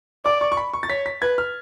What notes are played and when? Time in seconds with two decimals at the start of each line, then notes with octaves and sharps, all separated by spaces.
0.25 D5 D6
0.41 C#6
0.52 C#6
0.57 B5
0.73 C#6
0.83 A6
0.89 C#5 B6
1.06 B6
1.22 B4 G#6
1.38 F6